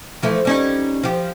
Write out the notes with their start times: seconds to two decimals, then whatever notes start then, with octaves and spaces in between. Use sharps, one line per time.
0.22 E3 F3 A3
0.45 G3 C#4 D#4
1.03 F3 G4